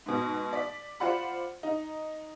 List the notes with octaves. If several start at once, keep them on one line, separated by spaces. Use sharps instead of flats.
G#2 B2
D5 B6
F4 C5 D5 F#5 B5
D#4